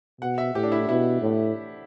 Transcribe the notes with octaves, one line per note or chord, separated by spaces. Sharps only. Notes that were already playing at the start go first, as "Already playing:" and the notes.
B2 F#5
E5
A2 G4
D4
E4
B2 E4
A2